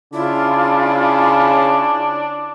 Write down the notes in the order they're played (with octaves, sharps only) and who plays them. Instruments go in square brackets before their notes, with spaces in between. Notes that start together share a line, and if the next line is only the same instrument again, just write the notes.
[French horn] C#3 [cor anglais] D4 [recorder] E4 [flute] F4